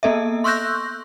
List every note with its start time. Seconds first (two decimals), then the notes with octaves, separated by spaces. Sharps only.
0.03 A#3 B3 A4 D#5 E5
0.44 C6 C#6 E6 F#6 G6 A#6